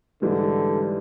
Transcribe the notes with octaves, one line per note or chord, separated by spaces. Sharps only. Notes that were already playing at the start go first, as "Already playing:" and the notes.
G#2 D3 E3 G3